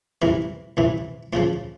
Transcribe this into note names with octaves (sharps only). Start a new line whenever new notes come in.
C2 C3 E3 A#4
C2 C3 E3
D2 C#3 F3 F4